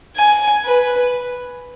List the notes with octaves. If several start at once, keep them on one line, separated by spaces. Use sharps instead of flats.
G#5
B4